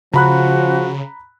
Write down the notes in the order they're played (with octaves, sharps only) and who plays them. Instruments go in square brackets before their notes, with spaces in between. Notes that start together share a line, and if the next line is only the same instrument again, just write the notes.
[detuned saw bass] C#3 [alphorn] F3 [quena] F#4 [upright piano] A#5 B5 F#6